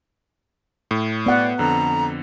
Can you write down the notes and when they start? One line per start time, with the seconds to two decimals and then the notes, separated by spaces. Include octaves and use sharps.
0.91 A2
1.26 B3 D5 F#5
1.59 F2 D3 A#5